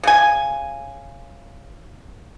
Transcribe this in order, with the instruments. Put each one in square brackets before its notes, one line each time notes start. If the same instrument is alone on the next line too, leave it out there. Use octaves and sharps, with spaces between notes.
[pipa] C#3 G#5